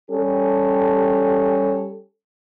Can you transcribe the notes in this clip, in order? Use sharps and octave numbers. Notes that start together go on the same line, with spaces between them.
G3 C#4 G4 A4